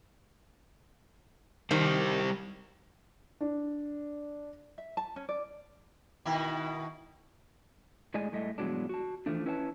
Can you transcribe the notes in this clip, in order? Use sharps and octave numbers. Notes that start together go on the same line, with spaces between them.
D#3 G3 G4 C5
D4
E5
A5
C#4
D5
B2 D#3 E4
A2 G#3 G#4 D5 D#5 G#5
A2 G3 A3 D#5
G2 B2 E3 F#3 G#3 D4
F#4 A5
E3 F3 A3 D4
C#4 E4 B4 C#5 F#5 A5